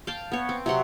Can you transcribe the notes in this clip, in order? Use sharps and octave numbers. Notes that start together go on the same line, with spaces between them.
F5 G5 A5
B3 C#5
C4
C3 F#3 F#5 C6